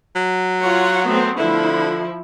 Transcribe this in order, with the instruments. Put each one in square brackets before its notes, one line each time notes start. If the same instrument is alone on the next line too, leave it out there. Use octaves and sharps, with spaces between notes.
[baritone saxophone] F#3
[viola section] F4 C#5 F#5
A3 B3 C4
[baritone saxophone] D3 [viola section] F3 E4